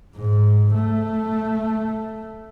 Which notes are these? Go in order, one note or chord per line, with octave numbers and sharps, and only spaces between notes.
G#2
A3